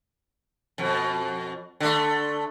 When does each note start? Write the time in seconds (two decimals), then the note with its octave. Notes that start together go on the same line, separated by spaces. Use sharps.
0.78 F2 B2
1.80 D3 A3